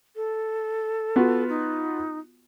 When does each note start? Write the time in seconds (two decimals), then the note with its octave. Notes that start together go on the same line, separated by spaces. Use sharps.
0.16 A4
1.16 B3 F4 F#4
1.49 D#4